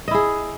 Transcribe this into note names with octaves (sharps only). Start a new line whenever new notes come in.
E4 G#4 D#5